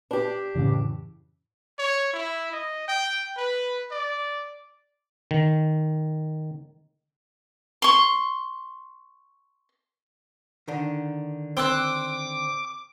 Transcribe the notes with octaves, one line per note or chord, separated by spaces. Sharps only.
D4 G4 B4
F2 A2 C#3 E3
C#5
E4
D#5
G5
B4
D5
D#3
C6 C#6
D3 D#3
C4 C6 D6 E6 F#6